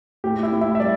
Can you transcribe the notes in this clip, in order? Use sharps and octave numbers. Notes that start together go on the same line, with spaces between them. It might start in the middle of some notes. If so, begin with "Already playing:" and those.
A2 G4
E4
A2
E4
E5
G3 D5